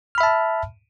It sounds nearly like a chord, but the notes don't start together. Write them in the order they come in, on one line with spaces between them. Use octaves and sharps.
F6 B5 E5 A5